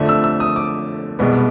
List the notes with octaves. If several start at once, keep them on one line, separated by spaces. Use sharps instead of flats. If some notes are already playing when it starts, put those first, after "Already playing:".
Already playing: F2 D3 F3 A3
E6
E6
D#6
D6
C2 B2 G#3 B3